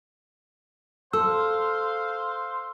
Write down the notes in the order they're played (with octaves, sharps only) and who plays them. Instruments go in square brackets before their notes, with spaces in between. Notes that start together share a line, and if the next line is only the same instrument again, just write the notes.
[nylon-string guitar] A4 [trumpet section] C5 F5 C6 [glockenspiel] E6